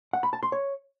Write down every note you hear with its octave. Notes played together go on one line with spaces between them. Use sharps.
F#5
B5
A5
C6
C#5